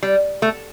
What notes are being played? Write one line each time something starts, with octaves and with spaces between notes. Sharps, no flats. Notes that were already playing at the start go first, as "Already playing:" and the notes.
G3
A3